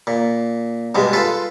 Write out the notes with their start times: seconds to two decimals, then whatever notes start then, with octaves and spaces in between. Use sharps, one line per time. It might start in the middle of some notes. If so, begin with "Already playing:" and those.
0.07 A#2
0.95 G2 B2 G#3
1.13 F4 A4 B4